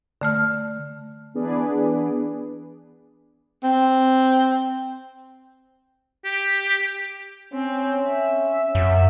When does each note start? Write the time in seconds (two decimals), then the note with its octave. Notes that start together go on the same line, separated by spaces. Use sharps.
0.21 D3 A3 F6
1.34 E3 B3 D4 G#4 B4 D5
3.63 C4
6.25 G4
7.54 C4 C#4
8.06 E5
8.75 F#2 E5